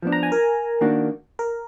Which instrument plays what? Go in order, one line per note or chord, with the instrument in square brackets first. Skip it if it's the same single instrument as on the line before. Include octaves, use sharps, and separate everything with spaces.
[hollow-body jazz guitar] F3 B3 D4
[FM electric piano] A#5
G#5
A#4
[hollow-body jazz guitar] D#3 A#3 D4 F#4
[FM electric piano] A#4